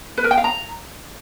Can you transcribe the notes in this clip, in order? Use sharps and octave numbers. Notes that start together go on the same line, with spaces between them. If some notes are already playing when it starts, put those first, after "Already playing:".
B4
A#4
G5
F5
A#5